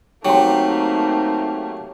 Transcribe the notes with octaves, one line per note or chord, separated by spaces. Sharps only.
F#3 A3 A#3 C4 D#4 G4 C6